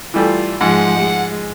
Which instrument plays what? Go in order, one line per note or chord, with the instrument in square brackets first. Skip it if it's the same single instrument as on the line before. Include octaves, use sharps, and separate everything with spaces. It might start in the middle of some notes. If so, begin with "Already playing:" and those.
[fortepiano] E3 G3 A3 [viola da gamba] F4
[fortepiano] G#2 [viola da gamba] F3 G#3 [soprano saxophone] F#5
[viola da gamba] G#3